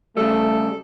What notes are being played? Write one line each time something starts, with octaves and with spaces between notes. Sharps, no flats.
C#3 G3 A3 A4